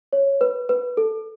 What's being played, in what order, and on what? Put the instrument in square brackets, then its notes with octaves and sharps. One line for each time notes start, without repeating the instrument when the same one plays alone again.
[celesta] C#5
B4
B4
A4